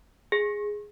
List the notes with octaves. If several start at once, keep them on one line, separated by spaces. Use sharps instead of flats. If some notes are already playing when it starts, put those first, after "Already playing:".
G#4